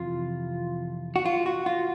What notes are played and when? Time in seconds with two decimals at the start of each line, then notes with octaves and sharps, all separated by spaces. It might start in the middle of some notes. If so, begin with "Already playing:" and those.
Already playing: F2 C3 E3 F4
1.16 F#4
1.26 F4
1.46 F#4
1.66 F4